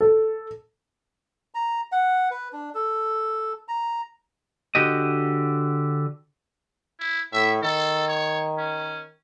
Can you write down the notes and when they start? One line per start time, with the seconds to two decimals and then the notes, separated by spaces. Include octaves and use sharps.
0.01 A4
1.55 A#5
1.92 F#5
2.31 B4
2.53 D4
2.75 A4
3.68 A#5
4.75 D3 F#4 G4 D#5
6.99 E4
7.33 A2 E5
7.63 D#3 A4
8.08 C#5
8.58 C#4